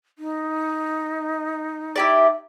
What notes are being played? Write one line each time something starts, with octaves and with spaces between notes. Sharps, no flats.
D#4
E4 G4 D5